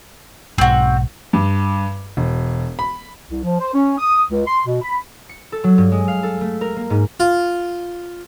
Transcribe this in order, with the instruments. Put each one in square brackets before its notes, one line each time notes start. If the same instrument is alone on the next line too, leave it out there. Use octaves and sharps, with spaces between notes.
[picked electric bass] B1 G#2 [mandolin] C4 F#4
[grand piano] G2
E1
B5
[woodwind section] C2
F3
C5
C#4
D#6
C#2
C6
B2
B5
[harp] C#7
A4
F#3
G2
G#3
F5
A4
A3
A#4
A#3
G#2
[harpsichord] F4